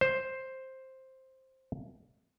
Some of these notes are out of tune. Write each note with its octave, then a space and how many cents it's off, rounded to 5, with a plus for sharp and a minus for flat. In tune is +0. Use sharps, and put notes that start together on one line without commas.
C5 +5